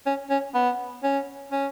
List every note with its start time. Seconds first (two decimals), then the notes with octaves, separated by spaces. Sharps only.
0.06 C#4
0.30 C#4
0.55 B3
1.03 C#4
1.52 C#4